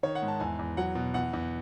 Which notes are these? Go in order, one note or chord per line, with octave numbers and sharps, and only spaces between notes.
D#3 C#5
F#5
G#2
A5
E2 G#5
E2
F#3 F#5
B2
E2 F#5
E2